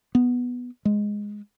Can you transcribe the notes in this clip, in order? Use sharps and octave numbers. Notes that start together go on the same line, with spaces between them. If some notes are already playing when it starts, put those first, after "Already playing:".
B3
G#3